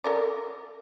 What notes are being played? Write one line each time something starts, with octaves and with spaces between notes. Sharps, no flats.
A4 A#4 D5